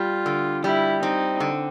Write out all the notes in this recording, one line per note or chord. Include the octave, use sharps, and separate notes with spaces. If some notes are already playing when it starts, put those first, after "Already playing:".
Already playing: G3 F4
D3
G3 E4
C4 D#4
D3